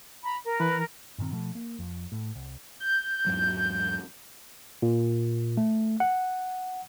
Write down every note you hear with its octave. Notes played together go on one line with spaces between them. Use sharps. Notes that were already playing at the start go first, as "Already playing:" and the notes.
A#5 B5
A#4
E3 B4
G2 A#2 D#3 C4
B2 F3 A3
A#3
F2
A2
C2
G6
E2 G#2 F#3
A#2
A3
F#5